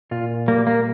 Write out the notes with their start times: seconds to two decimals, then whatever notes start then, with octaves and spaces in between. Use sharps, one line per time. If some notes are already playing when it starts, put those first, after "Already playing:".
0.11 A#2 F4
0.48 G3 A#3
0.67 A#3